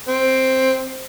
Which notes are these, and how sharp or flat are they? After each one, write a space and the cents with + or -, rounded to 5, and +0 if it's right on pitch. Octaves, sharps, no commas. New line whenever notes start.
C4 +5